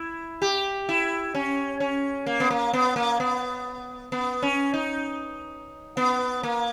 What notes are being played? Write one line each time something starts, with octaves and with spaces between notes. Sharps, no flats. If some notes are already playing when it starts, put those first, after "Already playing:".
Already playing: E4
G4
E4
C#4
C#4
A#3
B3
A#3
B3
A#3
B3
B3
C#4
D#4
B3
A#3